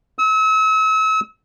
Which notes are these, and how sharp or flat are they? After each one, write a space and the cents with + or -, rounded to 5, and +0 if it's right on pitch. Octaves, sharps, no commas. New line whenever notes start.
E6 -40